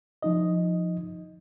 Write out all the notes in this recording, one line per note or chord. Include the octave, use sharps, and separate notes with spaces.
F3 D#4 D#5